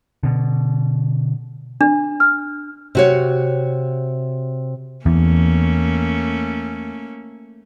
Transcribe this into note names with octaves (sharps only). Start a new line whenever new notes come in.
B2 D3
D4
F6
C3 F#4 C#5
E2 A3 A#3 C#4